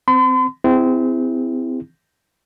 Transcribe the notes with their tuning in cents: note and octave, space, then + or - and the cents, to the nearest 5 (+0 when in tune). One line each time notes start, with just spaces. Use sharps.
C4 -15 C6 -45
C4 -25 E4 +0 G#4 -35